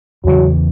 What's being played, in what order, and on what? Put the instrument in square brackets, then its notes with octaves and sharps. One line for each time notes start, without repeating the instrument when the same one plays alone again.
[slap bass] E2 C#3 E3 [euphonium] F#3